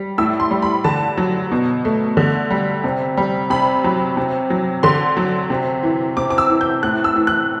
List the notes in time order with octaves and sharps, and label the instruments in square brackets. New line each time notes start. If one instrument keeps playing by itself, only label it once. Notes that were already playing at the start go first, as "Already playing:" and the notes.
Already playing: [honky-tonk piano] G3
A2 E6
C6
G3
B5
D3 A5
F#3
B2
A3
D3
G3
C3
G3
C3 B5
F#3
C3
F#3
D3 C6
F#3
C3
E3
C3 D6
D6
E6
E3
G6
A2 F#6
E6
E3
F#6